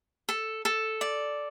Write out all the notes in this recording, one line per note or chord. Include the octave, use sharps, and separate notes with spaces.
A4
A4
D5